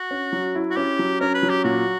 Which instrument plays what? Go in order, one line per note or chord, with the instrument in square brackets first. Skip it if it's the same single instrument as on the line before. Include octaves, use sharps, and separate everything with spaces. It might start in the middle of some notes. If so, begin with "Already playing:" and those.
Already playing: [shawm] F#4
[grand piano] C#4
F#3
E4
[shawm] F#4
[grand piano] C#4 [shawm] G4
[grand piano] F#3
[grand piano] C#4 [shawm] A#4
[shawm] B4
[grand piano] F#3
[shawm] G4
[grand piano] A#2 [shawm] F#4